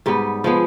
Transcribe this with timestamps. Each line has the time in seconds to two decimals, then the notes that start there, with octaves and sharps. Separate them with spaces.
0.06 G#2 G3 B3
0.44 F3 G#3 B3